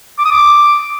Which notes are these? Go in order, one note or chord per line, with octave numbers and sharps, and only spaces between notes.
D6
D#6
D6